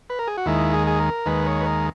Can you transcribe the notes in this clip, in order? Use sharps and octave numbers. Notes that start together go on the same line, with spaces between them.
B4
A#4
G#4
F#4
D#2 D#3 G#3 E4
G#4
G#4
A#4
D#2 D#3 G#3 B4
C#5
B4
A#4